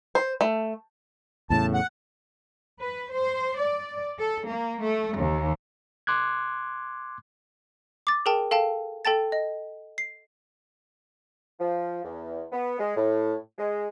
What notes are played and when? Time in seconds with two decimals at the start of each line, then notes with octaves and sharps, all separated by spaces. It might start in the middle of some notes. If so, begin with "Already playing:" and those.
0.15 C5
0.41 A3
1.50 E2 A2 C#3 A5
1.74 F#5
2.80 B4
3.11 C5
3.59 D5
4.18 A4
4.46 A#3
4.81 A3
5.15 D#2
6.07 C6 D6 F#6 G#6
8.07 D6 A6
8.26 G#4 A#4 G5 A5
8.51 A4 F5 G5 A5
9.05 A4 G5 A5 A6
9.32 D#5
9.98 C7
11.60 F3
12.04 E2
12.52 B3
12.79 G#3
12.96 A2
13.58 G#3